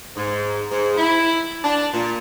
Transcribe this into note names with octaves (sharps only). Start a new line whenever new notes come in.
G#2
G#2
E4
D4
A#2